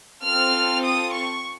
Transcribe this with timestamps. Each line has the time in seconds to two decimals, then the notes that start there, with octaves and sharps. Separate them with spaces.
0.24 C4 F4 A4 F6
0.83 D#6
1.13 C#6